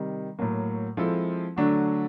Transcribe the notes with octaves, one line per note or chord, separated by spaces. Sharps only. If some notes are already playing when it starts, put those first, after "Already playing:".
Already playing: C3 D#3 G3
A2 F#3 A#3
F3 G#3 C4 E4 A4
D3 F#3 A3 D4 F#4